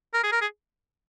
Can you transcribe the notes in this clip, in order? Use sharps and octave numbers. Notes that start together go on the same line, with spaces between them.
A#4
G#4
A#4
G#4